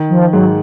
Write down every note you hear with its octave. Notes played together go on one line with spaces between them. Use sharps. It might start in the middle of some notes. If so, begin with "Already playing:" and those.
Already playing: D#3
F3
G#2 F#3